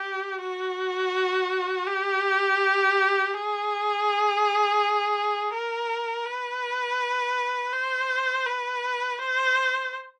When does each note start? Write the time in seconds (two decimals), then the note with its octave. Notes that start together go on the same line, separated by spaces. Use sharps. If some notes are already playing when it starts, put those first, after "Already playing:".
Already playing: G4
0.41 F#4
1.88 G4
3.33 G#4
5.54 A#4
6.26 B4
7.73 C5
8.46 B4
9.19 C5